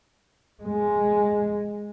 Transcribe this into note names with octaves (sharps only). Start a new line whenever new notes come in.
G#3